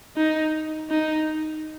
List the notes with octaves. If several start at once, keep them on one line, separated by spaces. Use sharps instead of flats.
D#4
D#4